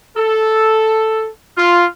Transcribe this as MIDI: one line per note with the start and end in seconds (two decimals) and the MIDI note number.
0.16 1.27 69
1.58 1.85 65